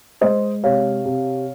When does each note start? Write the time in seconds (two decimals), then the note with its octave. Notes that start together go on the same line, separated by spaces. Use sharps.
0.21 G#3 C5 D#5
0.63 C3 C#5 F5
1.05 C3